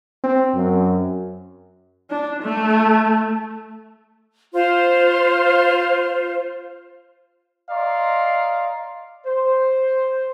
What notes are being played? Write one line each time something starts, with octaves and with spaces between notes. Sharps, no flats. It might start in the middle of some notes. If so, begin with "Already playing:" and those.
C4
F#2
D4
A3
F4 C5
D5 D#5 F5 A#5 C6
C5